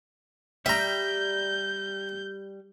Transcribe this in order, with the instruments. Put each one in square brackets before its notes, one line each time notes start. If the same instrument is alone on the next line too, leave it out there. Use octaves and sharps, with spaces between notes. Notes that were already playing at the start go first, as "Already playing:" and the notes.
[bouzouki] G3 [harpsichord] E5 A#5 [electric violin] G6